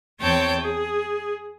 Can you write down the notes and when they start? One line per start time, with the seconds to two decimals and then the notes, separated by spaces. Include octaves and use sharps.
0.21 E2 C4 C#5 G5 A5
0.60 G#4